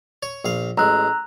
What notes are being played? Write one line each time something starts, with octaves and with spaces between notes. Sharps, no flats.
C#5
A#1 F5
A1 G#3 A#5 E6 F#6